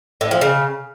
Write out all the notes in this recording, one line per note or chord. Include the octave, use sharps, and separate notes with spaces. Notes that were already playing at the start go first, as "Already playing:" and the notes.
A2
F3
C#3